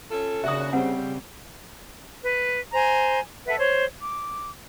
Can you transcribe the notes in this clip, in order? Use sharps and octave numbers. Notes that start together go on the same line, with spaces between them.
C#4 F4 A4
D#2 C#3 D4 F#4 E5 D#6
G3 C4 C5 F#5
B4
C5 G#5 A#5
A4 B4 E5 F#5
C5 C#5
D6